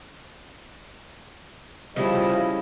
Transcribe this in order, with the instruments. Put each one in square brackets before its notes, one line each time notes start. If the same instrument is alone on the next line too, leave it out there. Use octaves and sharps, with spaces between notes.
[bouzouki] C#3 C#4 E4 [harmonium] F3 G3 D#5